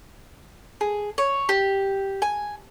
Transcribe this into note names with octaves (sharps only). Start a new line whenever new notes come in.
G#4
C#5
G4
G#5